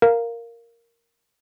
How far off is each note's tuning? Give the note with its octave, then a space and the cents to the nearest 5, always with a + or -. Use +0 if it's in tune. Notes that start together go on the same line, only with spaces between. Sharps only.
A#4 +0 F5 +0